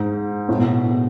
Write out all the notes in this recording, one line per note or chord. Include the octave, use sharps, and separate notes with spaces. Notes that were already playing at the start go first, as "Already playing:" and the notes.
Already playing: G#2
A2
B2